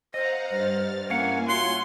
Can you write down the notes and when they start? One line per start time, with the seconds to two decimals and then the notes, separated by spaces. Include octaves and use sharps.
0.14 C5 D#5 F5 F#5 A#5
0.50 G2 C5 F6 A6
1.10 A#3 C#4 E4 F5 F#5 G#5
1.48 F4 F#4 C#5 F5 C6